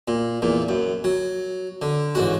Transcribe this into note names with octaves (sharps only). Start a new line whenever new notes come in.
A#2
E2 A#2
F#2
F#3
D3
A1 G#2 F#4